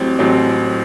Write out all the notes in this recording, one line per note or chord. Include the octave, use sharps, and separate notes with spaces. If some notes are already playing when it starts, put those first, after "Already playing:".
Already playing: A1 A2 F#3 C4 G4
A1 A2 F#3 C4 G4